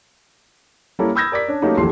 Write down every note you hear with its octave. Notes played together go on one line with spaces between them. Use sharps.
G3 A#3 C#4 E4 A4
B5 D#6 E6 G6 G#6 A#6
A#4 D5 D6 B6
C#4 D4
F#3 A3 A#3 C#4 D#4 G4
D#1 A#1 E3 A3 C6 C7